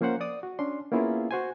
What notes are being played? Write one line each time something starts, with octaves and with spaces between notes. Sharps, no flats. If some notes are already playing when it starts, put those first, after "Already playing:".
F3 A#3 C#4 C5 F#5
D5 D#6
F#4
C#4 D4 C6
A#3 B3 C#4 E4 F4 G#4
F#4 C5 G#5